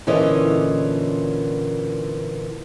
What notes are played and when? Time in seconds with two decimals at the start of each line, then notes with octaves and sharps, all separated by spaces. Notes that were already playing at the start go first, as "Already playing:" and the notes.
0.07 A#2 D3 E3 C#4 D#5